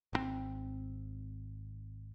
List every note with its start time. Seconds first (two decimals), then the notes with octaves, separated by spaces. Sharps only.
0.13 G#1 D#3 C4